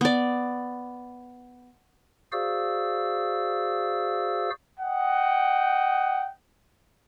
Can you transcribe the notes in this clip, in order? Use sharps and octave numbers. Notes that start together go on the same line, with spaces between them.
B3 D5
F#4 G#4 C5 D5 F5 E6
D#5 F#5 G5